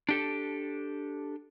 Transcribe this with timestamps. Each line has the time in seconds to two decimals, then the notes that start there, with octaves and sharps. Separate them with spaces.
0.09 D4 G4 A4